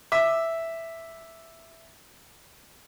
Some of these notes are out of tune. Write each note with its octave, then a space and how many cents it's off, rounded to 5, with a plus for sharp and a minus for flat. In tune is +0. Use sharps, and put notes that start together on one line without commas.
E5 +0 D6 +15